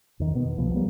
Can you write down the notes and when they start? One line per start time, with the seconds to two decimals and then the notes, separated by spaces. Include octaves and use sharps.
0.20 E2 D#3
0.35 B2 B3
0.57 C2 F3 B3
0.75 C#3 F#3 G3 A#3